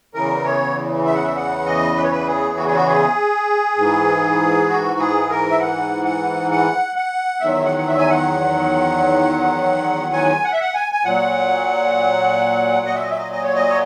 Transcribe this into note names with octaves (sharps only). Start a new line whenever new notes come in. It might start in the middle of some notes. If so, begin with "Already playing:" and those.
E2 C#3 E3 A#4
C#5
E5
F#5
E5
F#5
D#5
B4
C#5
B4
G#4
F#4
G#4
F#4
G#4
G#2 E3
F#4
G#4
A#4
E5
F#5
F#5
F#5
F#5
E2 D#3 F#3 E5
F#5
F#5
E5
G#5
F#5
G#5
F#5
E5
F#5
G#5
G#5
A#2 F#3 F#5
D#5
E5
D#5
E5
D#5
D#5
C#5
D#5
C#5